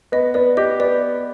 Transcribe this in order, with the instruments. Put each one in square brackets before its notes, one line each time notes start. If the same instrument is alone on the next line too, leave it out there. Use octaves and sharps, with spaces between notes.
[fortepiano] B3 [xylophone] D#5
[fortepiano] B3 [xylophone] D5
[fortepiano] G4 [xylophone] D#5
[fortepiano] B3 [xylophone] D5